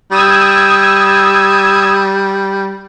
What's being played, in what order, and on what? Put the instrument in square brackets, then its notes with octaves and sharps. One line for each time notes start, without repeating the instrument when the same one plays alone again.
[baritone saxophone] G3 [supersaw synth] D#6 E6 G#6